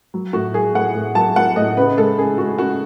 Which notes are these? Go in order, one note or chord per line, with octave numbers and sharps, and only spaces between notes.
F#3
A2 F#4
F#3 G#4
A2 F#5
A2
F#3 A5
F#3 F#5
A2 D#5
C#3 B4
G#3 A4
C#3 G#4
G#3 F#4
C#3 F#4